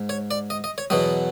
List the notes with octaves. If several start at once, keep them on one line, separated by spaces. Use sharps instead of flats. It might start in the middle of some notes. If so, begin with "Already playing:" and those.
Already playing: G#2
C#5
D5
D#5
D#5
C#5
E2 B2 F#3 D#5